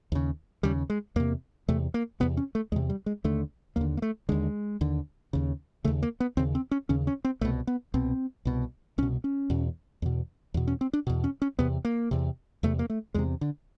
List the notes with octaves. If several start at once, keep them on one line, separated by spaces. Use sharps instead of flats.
D#2 C#3
D#2 C#3 G3
G#3
E2 C3 A#3
E2 C3 A3
A#3
E2 C3 B3
C#4
A3
E2 C3 G#3
G3
G#3
D#2 D3 A3
D#2 D3 A#3
A#3
A3
D#2 D3 G#3
D#2 D3
D#2 C#3
D#2 C#3 A3
A#3
B3
D#2 C#3 C4
C4
C#4
D#2 C#3 C#4
C#4
C4
C2 B2 A3
B3
C2 B2 C4
C2 B2
C2 B2 C#4
C#4
E2 B2
E2 B2
E2 B2
C#4
C4
D4
E2 B2
C#4
C#4
E2 C3 B3
A#3
E2 C3
E2 C3 A3
A#3
A3
E2 C3 G#3
D3